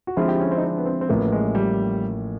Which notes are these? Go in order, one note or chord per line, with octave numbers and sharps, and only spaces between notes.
F#4
D3 F3 G#3 C4 E4 F4
G4
C#4
C4
D#4
D4
B3
C4
C4
A1 A2 F3 A#3 B3
G#3
G3